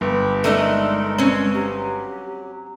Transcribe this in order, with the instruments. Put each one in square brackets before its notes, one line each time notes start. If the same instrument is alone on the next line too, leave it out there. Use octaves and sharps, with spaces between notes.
[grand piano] G1 [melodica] G4 B5
[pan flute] G#3 [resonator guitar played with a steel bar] A3 D4 D#4 [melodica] A4 A#4
[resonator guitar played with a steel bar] C4 C#4 [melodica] C#5
[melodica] F#3 [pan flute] G4